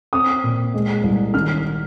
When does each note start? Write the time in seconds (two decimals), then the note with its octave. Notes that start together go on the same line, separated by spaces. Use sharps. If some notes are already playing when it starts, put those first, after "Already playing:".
0.13 C4 D#6
0.44 A#2
0.74 G#3
1.03 C2
1.34 D#3 F6